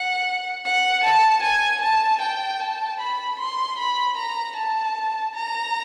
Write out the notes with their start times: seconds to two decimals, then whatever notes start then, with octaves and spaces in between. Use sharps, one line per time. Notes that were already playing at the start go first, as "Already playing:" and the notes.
Already playing: F#5
0.65 F#5
1.04 A5
1.43 G#5
1.82 A5
2.21 G5
2.60 A5
3.00 B5
3.39 C6
3.78 B5
4.17 A#5
4.56 A5
5.34 A#5